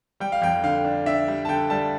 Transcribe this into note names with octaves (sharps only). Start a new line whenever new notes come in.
G3 G5
F5
F2 G5
D3 F5
D4
D4 E5
G3
A5
D3 G5
G3 A5